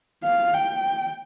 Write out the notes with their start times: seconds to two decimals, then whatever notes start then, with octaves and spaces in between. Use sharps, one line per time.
0.24 F5
0.53 G5